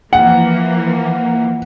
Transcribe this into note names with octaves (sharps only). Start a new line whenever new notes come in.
E3 F3 A#3 F#5